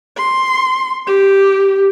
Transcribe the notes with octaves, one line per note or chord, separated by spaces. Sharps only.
C6
G4